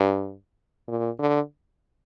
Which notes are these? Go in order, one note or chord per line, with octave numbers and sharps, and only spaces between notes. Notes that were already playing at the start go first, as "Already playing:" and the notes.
Already playing: G2
A#2
D3